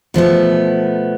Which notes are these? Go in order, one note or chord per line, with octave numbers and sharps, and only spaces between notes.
B2 F3 A3 B3